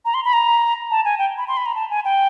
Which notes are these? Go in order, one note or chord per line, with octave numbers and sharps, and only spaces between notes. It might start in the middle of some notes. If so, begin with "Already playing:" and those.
A#5
C6
B5
A#5
A5
G#5
G5
B5
C6
B5
A#5
A5
G#5
G5